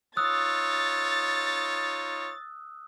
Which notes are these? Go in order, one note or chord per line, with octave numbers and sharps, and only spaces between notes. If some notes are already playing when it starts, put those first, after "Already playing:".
D#4 F4 C#5 D#6 E6 F#6 A6